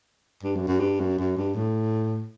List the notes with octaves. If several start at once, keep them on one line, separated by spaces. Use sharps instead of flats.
G2
F#2
F#2
G2
F#2
F#2
G2
A2